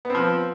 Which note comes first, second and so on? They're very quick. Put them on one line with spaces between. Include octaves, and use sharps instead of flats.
B3 C4 F3